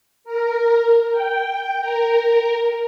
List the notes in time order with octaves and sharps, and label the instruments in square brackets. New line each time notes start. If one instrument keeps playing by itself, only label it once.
[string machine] A#4
G5
A#4